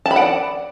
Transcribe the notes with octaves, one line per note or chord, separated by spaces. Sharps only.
A5
B5
F#5
D5